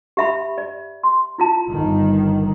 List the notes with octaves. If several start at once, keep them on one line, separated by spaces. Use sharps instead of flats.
G4 E5 B5
D5
C6
E4 F4 A5
G1 D#3